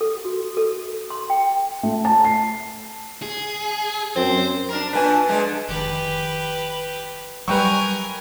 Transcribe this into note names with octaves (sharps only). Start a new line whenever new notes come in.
A4
F#4
A4
C6
G5
A3
A5
C7
G#4
F#2 C4 C5
D4 A#4
A#2 D4 B4 G#5
D3 G#3 D4
F1 D#3 G4 B4
F#3 G3 A#4 B4 G5 G#5 C#6